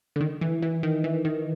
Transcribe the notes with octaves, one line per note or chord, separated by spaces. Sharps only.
D3
D#3
E3
E3
D#3
E3
D#3